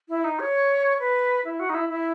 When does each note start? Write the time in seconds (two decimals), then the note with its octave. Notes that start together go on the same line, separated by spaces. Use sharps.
0.09 E4
0.24 D#4
0.40 C#5
1.00 B4
1.45 E4
1.60 F#4
1.69 D#4
1.74 E4
1.89 E4